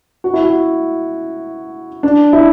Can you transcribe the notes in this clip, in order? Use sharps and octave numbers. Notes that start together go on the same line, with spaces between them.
F#4
E4
F#4
D4
E4